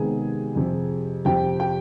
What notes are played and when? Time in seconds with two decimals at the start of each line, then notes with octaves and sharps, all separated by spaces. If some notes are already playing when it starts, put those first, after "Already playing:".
Already playing: C3 D#3 G#3 B3 G#4 G#5
0.56 F2 C3 F3
1.25 F2 C3 F3 G4 G5
1.60 G4 G5